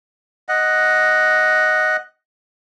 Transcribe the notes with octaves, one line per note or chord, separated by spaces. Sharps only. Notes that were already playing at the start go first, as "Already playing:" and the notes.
D#5 F#5